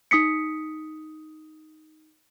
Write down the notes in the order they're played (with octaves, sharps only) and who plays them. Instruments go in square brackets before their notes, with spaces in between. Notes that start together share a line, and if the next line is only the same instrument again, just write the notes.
[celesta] D#4 D#6 B6 C#7